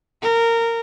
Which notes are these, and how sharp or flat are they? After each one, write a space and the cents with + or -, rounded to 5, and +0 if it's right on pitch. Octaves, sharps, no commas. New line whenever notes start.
A#4 -15